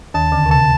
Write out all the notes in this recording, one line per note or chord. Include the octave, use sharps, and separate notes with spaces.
D#2 D#3 A5
D2 D3
C3
C#3 A5